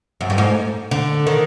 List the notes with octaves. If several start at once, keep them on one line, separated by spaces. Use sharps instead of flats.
F#2
G2
G#2
D3
D#3